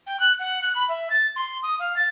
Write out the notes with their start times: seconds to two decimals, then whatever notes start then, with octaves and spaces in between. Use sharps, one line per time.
0.06 G5
0.19 F#6
0.39 F#5
0.62 F#6
0.75 B5
0.88 E5
1.10 A6
1.36 C6
1.63 D#6
1.79 F5
1.96 A6